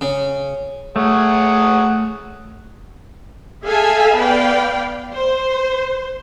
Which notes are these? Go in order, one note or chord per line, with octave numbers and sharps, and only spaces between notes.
C#3
A3 G#4 C#5 F#5
G#4 A4 E5 F5 G#5 A5
B3 B4 D5 F5 G5
C5